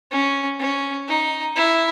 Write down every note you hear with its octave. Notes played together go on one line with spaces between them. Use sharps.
C#4
C#4
D#4
E4